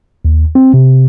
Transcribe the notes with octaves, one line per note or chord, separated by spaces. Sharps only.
D#2
C4
C3